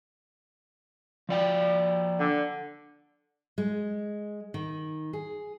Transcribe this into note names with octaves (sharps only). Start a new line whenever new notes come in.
F3 D5 G5
D3
G#3
D#3
G#4